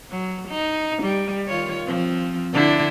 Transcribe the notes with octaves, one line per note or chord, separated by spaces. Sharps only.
F#3
D#4
G3
D#3 F4 C#5
F3 C4
D3 D4 E4